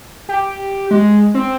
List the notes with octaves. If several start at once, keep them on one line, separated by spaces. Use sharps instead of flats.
G4
G#3
C4